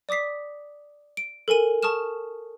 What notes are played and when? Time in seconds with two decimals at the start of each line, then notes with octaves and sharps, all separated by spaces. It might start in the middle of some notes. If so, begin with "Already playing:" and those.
0.09 D5 D6 D#6 B6 C7
1.17 D7
1.48 A4 A#4 G#5 D#7
1.83 A5 C#6 D#6 F6 E7